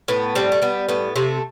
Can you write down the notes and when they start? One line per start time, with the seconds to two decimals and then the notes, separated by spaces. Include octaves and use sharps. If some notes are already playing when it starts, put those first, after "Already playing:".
0.08 A2 B3
0.35 G3 C4
0.52 A3
0.62 G3 B3
0.89 A2 B3
1.16 C3 A3